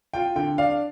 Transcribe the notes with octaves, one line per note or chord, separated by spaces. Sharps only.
F4 G5
D3 G5
D4 F5